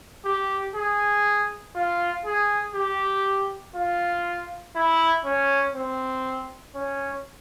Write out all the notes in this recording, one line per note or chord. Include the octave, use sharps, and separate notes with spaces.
G4
G#4
F4
G#4
G4
F4
E4
C#4
C4
C#4